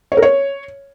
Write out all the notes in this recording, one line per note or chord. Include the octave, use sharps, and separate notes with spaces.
C#5
A#4
C#5